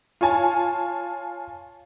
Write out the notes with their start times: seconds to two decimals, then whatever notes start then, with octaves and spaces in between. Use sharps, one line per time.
0.21 F4 C#5 G#5 A5